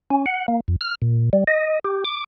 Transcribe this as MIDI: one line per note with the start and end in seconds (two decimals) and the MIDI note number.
0.11 0.26 61
0.26 0.46 78
0.48 0.60 58
0.68 0.76 41
0.81 0.95 89
1.02 1.30 46
1.33 1.44 55
1.47 1.79 75
1.85 2.04 67
2.05 2.24 86